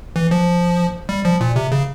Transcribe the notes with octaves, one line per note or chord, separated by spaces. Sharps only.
E3
F3
G3
F3
A#2
C3
C#3